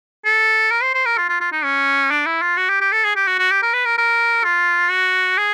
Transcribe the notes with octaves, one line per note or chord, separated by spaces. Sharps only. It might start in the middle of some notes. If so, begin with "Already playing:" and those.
A4
A#4
C5
C5
A#4
F4
F4
F4
D#4
C#4
D4
E4
F4
F#4
G4
G4
A4
G#4
G4
F#4
F#4
G4
A#4
B4
A#4
A#4
F4
F#4
G#4